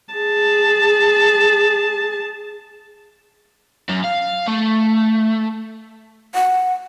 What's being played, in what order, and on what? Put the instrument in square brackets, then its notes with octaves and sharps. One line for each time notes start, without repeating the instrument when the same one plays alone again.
[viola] G#4 A5
[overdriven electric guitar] F#2
F5
A3
[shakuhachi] F#5